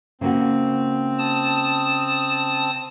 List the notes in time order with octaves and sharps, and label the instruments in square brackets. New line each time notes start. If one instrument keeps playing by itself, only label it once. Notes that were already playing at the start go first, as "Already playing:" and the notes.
[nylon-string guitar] C#3 A#3 F#4 [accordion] C4
[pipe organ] A5 D#6